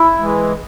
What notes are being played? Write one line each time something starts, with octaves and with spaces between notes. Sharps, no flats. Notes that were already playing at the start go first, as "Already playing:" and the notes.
Already playing: E4
E3 G#3